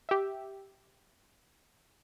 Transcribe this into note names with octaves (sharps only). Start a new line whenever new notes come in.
G4 E5